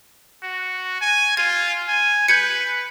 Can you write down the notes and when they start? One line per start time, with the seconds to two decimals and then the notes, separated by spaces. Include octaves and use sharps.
0.43 F#4
1.01 G#5
1.37 F4 G#6
1.88 G#5
2.28 B4 G6 G#6 C#7